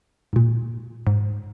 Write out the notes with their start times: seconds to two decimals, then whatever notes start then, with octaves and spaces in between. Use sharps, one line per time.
0.33 G#2
0.36 A#2
1.07 G#2